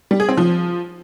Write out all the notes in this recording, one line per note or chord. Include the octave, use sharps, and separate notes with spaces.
G3
G#4
C4
F3